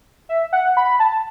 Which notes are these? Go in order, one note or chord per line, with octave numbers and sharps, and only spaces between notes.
E5
F#5
B5
A5